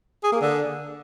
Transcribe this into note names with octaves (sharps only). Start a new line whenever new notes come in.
G#4
A#3
D3